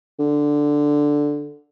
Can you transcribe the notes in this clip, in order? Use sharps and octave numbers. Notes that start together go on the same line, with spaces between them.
D3